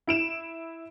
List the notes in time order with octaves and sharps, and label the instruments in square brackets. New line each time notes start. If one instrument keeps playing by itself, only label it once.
[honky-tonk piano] E4 D7 E7